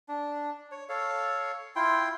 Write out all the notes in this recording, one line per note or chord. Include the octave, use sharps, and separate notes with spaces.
D4
C#5
A4 C#5 F5
E4 F4 G5 C6